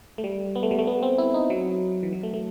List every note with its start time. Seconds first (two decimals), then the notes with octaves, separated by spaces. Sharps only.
0.18 A3
0.24 G3
0.55 B3
0.63 A3
0.71 G3
0.79 A3
0.87 B3
1.03 C4
1.18 E4
1.34 D#4
1.50 F#3
2.03 E3
2.13 F#3
2.23 A3
2.34 A3